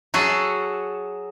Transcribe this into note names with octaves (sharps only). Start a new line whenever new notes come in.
F#3 F#4 G#4 A4